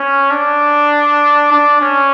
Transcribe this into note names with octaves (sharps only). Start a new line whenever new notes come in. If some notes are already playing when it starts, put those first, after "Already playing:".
Already playing: C#4
D4
D4
C#4